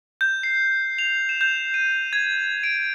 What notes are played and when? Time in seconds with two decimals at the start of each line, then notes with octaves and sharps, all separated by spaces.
0.21 G6
0.43 C7
0.98 F7
1.29 E7
1.41 G6
1.74 D#7
2.13 G#6
2.63 D7